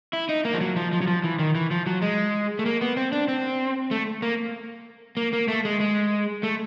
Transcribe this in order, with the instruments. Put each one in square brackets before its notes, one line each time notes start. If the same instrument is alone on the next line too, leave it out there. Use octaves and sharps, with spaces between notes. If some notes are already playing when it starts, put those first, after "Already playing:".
[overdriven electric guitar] E4
D#4
A#3
F3
F#3
F3
F3
F#3
F3
E3
D#3
E3
F3
F#3
G#3
A3
A#3
B3
C4
D4
C4
A3
A#3
A#3
A#3
A3
G#3
G#3
A3